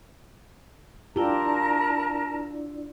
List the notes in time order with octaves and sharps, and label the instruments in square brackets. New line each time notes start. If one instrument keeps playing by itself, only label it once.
[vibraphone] D4 E4 D5 [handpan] F4 G4 [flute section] A#4 A5 A#5